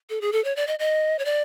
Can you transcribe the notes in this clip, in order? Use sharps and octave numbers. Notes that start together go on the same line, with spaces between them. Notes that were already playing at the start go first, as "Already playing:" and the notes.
A4
G#4
A4
C#5
D5
D#5
D#5
C#5
D5